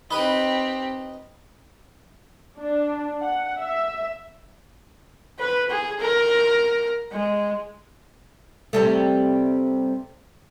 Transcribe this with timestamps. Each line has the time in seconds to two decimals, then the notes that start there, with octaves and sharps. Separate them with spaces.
0.11 C4 D#4 G4 B4 D#5 B5
2.57 D4
3.21 F#5
3.59 E5
5.40 B4
5.70 G#4
6.00 A#4
7.12 G#3
8.73 C3 G3 A3